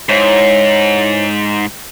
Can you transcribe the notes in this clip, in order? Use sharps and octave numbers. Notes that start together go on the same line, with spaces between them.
G#2 E4 C5 C#5